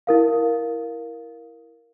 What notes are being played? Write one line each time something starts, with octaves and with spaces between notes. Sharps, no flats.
E4 A#4 F5